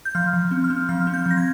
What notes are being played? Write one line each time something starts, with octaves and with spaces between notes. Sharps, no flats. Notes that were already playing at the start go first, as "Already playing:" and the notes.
G6
F3 F6
F3
C4
F6
C4
F3 F6
C4
G6
F3 A#6
G#6